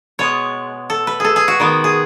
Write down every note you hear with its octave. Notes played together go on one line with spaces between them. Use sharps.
B2 G#3 B3 C#5
A4
B4
G#4 A4
G#4
F#4
D#3 G#3 B3
G#4